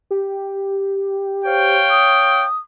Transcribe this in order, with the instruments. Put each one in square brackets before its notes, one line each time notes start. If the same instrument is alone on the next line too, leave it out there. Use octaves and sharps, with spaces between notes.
[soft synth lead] G4
[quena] C5 [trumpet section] C#5 F5 G5
[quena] D#6